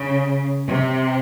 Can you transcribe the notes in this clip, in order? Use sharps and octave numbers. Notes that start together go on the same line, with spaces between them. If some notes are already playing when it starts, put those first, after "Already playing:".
Already playing: C#3
C3